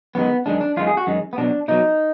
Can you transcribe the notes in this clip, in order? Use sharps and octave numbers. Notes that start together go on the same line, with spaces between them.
F#2 D#3 G#3 B3
F#2 D#3 G#3 D4
D4
F#2 D#3 G#3 F4
G#4
F#4
F#2 D#3 G#3
B3
B2 F#3 D4
B2 F#3 D#4